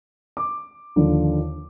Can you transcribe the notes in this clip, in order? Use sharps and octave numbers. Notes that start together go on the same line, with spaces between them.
D6
D#2 D3 F3